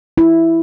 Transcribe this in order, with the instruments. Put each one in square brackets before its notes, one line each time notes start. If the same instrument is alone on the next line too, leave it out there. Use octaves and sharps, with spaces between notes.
[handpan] E4